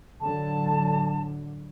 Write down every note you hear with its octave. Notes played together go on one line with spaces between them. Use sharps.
A2 D3 F#3 A5